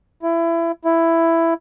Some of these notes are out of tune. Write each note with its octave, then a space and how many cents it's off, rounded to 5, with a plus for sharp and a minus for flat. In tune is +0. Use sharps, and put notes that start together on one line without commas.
E4 +25
E4 +10